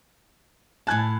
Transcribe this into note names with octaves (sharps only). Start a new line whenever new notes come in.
A2 G#5 A5 F#6 G#6